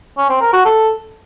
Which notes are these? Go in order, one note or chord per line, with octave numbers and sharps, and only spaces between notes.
C#4
C4
A#4
F#4
A4